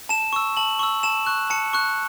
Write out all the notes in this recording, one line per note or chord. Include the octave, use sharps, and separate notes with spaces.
A5 E7
C#6 E6
A5 F#7
C#6 E6
A5 E7
C#6 F#6
A5 C#7
C#6 F#6